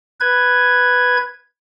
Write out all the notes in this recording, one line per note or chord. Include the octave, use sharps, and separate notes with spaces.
B4 G#6